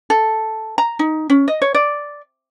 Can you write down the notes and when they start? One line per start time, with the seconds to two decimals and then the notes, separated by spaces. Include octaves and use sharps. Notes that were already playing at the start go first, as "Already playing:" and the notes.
0.10 A4
0.78 A#5
0.99 D#4
1.30 C#4
1.48 D#5
1.62 C#5
1.75 D5